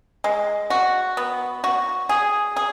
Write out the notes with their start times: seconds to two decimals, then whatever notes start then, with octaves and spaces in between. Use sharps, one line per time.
0.24 G#3
0.70 F#4
1.17 B3
1.64 F#4
2.09 G#4
2.56 G#4